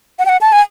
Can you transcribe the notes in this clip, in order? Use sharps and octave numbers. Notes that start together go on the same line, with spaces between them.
F#5
G5
F#5
A5
G#5